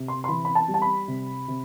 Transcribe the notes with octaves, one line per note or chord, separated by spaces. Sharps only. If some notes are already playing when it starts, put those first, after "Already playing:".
Already playing: C3
C6
C6
E3 B5
B5
A5
G3
A5
B5
C3
C3